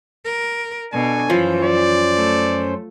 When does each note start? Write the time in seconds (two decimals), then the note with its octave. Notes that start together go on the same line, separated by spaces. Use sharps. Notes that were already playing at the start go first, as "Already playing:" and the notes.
0.25 A#4
0.93 B2 D4 A4 G#5
1.30 F#2 E3 F3 C#4 C5
1.64 D5
2.16 A3